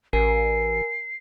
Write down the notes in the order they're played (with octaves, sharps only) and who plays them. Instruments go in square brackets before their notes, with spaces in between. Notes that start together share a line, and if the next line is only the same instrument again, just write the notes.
[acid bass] A1 [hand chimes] A#4 G#5 [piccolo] C7